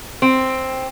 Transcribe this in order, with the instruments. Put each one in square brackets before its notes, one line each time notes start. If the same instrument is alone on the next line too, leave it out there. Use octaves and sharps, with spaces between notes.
[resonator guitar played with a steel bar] C4